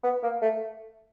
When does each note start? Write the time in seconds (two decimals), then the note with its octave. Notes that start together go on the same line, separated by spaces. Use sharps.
0.03 B3
0.23 A#3
0.42 A3